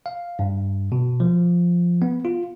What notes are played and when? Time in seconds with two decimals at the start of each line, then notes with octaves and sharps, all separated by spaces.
0.06 F5
0.39 G2
0.92 B2
1.20 F3
2.02 B3
2.25 F4